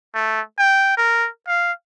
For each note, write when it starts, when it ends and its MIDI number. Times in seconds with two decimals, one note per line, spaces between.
0.15 0.41 57
0.58 0.93 79
0.97 1.29 70
1.47 1.72 77